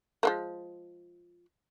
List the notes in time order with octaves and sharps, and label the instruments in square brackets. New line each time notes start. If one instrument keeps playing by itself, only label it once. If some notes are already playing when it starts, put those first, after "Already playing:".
[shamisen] F3 G#3 A#3